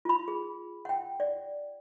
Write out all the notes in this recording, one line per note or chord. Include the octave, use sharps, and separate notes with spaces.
F4 B5
G#4
F#5 G5
D5